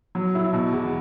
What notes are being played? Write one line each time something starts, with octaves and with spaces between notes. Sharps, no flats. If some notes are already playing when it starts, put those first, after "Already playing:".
F#3
E4
B2
E2